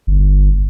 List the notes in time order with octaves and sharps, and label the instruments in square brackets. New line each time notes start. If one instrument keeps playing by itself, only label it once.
[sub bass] G1